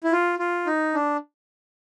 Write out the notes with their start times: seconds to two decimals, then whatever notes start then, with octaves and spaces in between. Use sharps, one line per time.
0.04 E4
0.13 F4
0.39 F4
0.67 D#4
0.94 D4